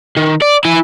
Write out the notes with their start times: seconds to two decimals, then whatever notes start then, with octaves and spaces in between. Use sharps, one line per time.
0.16 D#3
0.42 D5
0.64 E4 G#5